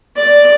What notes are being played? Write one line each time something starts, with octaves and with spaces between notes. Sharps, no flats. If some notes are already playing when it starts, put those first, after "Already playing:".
D5